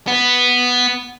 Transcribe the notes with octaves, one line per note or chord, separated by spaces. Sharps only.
B3